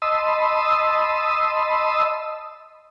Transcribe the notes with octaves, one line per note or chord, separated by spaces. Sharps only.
D#5 A5 B5 C6 D#6 E6